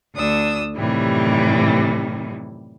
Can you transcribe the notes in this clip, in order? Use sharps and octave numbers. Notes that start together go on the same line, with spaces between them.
D2 D4 D#6 E6
F#2 A2 C3 D#3 E3 G3